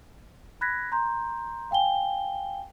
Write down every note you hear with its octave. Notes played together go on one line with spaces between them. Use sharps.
B5 F#6 G#6 A#6 B6
A#5 C6 G6
F5 G5 G#5 G7